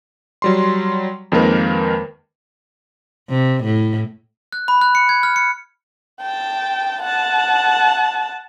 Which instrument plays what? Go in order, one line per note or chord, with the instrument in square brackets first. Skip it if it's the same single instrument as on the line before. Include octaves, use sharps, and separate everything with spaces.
[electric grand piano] F#3 G3 C6
F2 D#3 G#3 A#3 A#4 B4
[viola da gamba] C3
A2
[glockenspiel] F#6
B5
F#6
C#7
G#6
F6
C#7
[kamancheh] G5 A5
F#5 A5